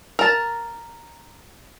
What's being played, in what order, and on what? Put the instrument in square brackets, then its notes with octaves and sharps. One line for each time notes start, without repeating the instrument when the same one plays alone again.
[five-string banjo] A#4 A5